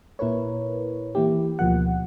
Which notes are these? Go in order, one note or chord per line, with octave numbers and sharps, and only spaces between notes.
A#2 E4 A#4 B4 C#5
E3 A#3 E4 G4
D2 B2 F3 A#3 F#5